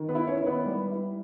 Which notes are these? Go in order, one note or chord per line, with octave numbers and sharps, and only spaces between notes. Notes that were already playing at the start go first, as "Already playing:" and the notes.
Already playing: D#3
B3 B4
E4
C#4 C#5
D#3
B3 B4
G3
E4